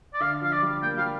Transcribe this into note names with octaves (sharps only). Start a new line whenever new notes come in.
D5
D3 F5
F3 F5
D5
G3
A#3 G5
G3 F5